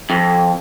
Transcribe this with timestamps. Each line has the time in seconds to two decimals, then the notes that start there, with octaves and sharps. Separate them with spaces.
0.10 F2